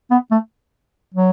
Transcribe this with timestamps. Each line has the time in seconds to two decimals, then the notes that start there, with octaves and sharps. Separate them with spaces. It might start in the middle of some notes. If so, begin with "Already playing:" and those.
0.11 B3
0.31 A3
1.14 F#3